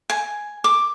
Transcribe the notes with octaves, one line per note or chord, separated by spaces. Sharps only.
G#5
D6